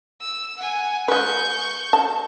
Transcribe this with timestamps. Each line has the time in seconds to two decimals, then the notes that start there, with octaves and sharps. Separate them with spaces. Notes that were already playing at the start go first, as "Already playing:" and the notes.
0.21 E6
0.57 F#5 G#5
1.08 G#3 B4 C#6 G6
1.93 A5